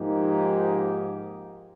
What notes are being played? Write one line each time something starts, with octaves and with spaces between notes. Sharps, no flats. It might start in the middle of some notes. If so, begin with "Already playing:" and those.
Already playing: G#2 F3 A#3 D#4 G4